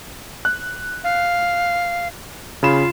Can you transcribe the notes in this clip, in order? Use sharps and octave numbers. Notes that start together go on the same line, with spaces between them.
F#6
F5
C#3 F4 B5 E7